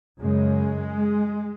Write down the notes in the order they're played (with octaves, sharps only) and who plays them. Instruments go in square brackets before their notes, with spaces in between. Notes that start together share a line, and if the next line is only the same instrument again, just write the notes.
[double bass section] F#2 C#3 G#3